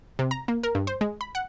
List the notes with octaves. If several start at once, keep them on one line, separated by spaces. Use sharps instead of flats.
C3
A#5
A#3
A#4
G2
C5
G#3
B5
F#5